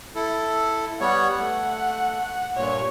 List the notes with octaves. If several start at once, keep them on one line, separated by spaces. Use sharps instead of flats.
E4 A4
G3 B3 C#5 F#5
A3
G2 A#2 C#5